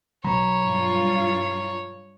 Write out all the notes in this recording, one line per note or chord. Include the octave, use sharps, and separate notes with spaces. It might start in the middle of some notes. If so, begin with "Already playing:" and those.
B2 F#3 C#5 A#5 B5
G2 F4